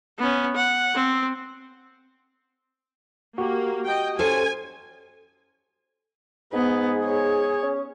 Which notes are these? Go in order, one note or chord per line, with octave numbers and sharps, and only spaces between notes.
B3 C#4
F#5
C4
A#3 F#4 G4
D#5 G5
C#4 A4 C5 G#5
G#2 B3 G#4
C#5
C#4